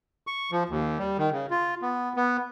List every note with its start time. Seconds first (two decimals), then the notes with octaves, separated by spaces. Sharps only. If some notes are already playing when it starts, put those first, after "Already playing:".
0.27 C#6
0.52 F3
0.69 D#2
0.99 G3
1.18 D#3
1.32 C#3
1.50 F4
1.82 B3
2.17 B3